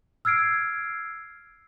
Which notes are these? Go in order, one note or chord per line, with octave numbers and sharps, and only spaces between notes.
E6 F6 G#6 C7 D7